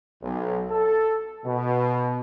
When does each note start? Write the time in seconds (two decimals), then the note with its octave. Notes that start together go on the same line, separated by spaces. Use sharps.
0.22 B1
0.68 A4
1.45 B2